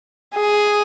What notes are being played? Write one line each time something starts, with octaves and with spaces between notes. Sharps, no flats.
G#4